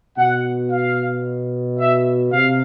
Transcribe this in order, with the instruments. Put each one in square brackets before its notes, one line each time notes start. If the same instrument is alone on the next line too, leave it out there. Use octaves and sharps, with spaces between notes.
[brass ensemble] B2 F#5
F5
E5
C3 F5